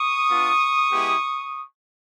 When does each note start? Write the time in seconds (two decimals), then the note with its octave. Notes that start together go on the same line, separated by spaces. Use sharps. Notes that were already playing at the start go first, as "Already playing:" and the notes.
Already playing: C#6 D#6
0.29 B3 D4 F4
0.91 G#3 B3 E4 G4